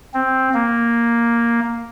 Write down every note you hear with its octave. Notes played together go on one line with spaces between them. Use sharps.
C4
A#3